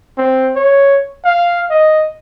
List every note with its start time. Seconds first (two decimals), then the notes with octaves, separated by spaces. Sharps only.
0.18 C4
0.56 C#5
1.25 F5
1.70 D#5